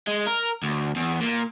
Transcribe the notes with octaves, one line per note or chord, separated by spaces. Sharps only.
G#3
A#4
D2
E2
A#2